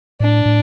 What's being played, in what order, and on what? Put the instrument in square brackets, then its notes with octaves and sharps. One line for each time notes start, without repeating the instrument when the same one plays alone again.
[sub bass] A2 [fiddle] D4
[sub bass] A2